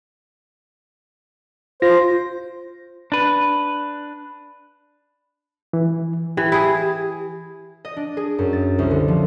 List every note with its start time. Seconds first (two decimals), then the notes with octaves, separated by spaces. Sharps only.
1.82 F4 C5 A#6
3.12 D4 B4
5.73 E3
6.37 E3 G4
6.52 E4 G#4
7.85 D#5
7.97 D4
8.17 G#4
8.39 F#2
8.53 A6
8.79 C2
8.91 D3
9.08 F3